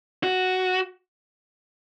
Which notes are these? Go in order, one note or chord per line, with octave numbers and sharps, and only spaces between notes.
F#4